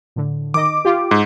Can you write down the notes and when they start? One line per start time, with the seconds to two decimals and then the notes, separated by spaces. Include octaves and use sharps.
0.16 A2 D3
0.54 D#3 D#5 D6
0.85 F4 G4
1.11 G#2